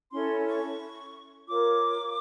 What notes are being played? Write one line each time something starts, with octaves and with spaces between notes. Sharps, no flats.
C#4 E4 A4 C#5 C6
C#6
F4 A#4 C#5 D6